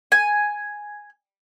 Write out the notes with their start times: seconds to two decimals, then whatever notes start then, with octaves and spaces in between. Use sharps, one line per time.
0.12 G#5